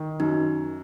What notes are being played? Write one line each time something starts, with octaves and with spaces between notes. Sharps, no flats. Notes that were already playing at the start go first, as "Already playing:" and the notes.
Already playing: D#3
F#2 D#4